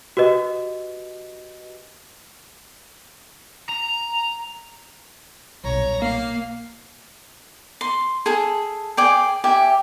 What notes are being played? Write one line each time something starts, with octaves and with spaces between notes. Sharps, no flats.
F#4 G4 B4 D#5
A#5
D#1 B1 C#5 A#5
A#3 F5
C6
G#4 A4
G#4 D5 G5
G4 E5 G#5